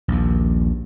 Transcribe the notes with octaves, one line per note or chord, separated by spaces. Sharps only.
A#1 D#2